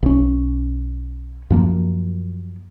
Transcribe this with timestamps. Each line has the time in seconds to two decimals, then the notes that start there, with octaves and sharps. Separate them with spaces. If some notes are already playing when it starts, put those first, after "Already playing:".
0.03 B1 C#4
1.50 F#2 F3 A#3